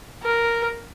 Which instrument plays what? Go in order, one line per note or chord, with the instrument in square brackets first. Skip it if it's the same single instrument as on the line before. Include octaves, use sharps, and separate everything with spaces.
[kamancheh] A#4